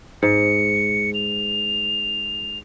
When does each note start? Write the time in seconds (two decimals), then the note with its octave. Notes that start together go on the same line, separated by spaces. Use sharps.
0.23 G#2 C#7
1.14 F7